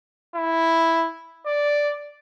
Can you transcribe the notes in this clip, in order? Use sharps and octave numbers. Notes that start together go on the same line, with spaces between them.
E4
D5